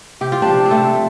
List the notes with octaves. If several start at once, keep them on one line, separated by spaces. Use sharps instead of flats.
C3 G4
F4
F3 D4 G4
C4
C3 A3